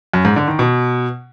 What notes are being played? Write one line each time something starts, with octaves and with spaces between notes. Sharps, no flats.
F#2
G#2
D3
D#3
B2